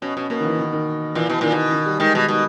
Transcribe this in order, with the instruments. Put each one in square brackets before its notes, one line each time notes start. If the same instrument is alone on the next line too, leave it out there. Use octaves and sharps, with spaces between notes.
[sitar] B2 [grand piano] C#4
[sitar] B2 [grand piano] C#4
[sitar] B2 [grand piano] A#3
[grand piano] D#3
E3
D#3
D#3
[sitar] A#2 [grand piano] E3
[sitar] B2 [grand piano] E3
[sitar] A#2 [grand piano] D#3
[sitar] B2
[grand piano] D#3
G3
[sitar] D#3 [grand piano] G#3
[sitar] B2
B2